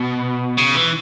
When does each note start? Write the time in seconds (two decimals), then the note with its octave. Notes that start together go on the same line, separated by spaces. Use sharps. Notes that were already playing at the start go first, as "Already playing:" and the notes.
Already playing: B2
0.58 C#3
0.75 E3